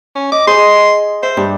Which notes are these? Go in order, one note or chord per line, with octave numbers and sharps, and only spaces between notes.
C#4
D#5 D6
G#4 D#5 C6
C5 E5
G2